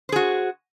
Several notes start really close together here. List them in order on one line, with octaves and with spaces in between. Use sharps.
C5 G#4 F#4